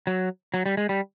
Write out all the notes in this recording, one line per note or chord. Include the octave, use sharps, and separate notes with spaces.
F#3
F#3
G3
G#3
G3